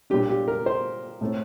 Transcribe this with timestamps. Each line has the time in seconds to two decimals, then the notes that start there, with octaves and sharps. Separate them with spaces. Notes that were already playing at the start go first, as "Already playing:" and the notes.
0.10 A#2 G3 D4 G4
0.29 G4
0.48 A#4
0.66 C5
1.21 A2 A3 C4